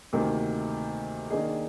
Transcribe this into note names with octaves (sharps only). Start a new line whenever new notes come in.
D2 C3 D#3 A#3
D#3 A#3 D4 G#4 D#5